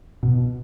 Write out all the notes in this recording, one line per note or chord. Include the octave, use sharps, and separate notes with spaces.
B2